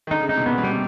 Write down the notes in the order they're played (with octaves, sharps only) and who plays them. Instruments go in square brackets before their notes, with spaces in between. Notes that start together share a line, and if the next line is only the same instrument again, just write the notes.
[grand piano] D#3
[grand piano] D3 [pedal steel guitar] D#4
[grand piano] C#3
[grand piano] C3 [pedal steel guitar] D#4
[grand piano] B2
[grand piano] A#2 [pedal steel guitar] B3
[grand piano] B2
[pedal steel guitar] G3
[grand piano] C3